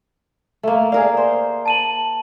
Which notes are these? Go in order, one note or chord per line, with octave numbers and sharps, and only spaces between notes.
A3 A#3
G#4 A#4 D5 F5
C5
A5 D#7 F#7